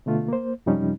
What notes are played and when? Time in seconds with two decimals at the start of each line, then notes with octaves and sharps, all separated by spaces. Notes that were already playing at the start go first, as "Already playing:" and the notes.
0.06 B2 D3 A3 F4
0.28 A#3 C5
0.66 F#2 C3 F3 G3 C#4 D#4